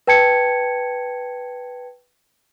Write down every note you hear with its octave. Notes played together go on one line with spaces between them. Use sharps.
B4 G5 A5 G#6 C#7